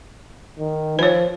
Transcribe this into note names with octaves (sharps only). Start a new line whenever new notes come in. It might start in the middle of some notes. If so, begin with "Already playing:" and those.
D#3
F3 B4 C#5